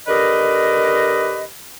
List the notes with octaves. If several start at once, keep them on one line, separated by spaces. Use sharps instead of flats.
D3 G4 A#4 B4 D#5